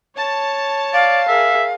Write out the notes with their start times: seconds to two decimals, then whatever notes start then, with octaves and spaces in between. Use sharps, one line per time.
0.17 C#5 A5
0.93 D5 F5
1.28 G#4 A#4 E5